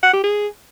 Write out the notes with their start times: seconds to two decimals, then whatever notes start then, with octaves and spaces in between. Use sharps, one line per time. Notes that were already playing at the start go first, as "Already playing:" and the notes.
0.03 F#5
0.13 G4
0.24 G#4